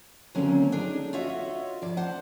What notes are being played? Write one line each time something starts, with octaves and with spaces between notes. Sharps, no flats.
D#2 D3 F#3 A#3 C4 C#4
D4 D#4 G#4 A4
F4 F#4 C#5 D#5 E5 F#5
F2 D5
C5 F#5 A5